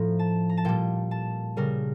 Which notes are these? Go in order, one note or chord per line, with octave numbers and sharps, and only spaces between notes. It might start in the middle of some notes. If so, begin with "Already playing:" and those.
Already playing: A2 F3 A#5
A5
A#5
A5
A#2 G3 G5
A5
C#3 G3 A#4